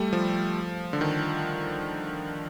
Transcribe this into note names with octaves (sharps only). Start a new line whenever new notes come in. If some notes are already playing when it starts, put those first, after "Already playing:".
Already playing: G3 A3
F3
D3
D#3